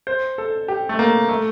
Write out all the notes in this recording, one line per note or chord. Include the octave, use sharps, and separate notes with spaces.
C5
A4
G4
A3
A#3
A3